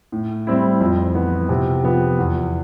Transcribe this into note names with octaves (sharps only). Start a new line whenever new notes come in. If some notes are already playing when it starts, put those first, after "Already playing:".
A2
G3 C4 E4
F2
E3 B3
C3
F3 B3
E2